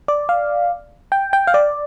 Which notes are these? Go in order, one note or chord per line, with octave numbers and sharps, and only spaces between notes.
D5
F5
G5
G5
F5
D5